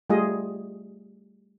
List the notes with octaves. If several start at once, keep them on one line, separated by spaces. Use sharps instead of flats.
G3 A3 F4 G#4 D#5